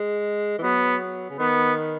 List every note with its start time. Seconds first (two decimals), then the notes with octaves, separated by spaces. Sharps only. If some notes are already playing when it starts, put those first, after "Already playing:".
Already playing: G#3
0.58 E3
0.63 F#3 B3
1.30 C#3
1.39 D#3 B3